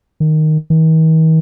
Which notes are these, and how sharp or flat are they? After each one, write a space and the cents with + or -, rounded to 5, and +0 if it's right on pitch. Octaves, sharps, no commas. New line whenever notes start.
D#3 -5
D#3 +45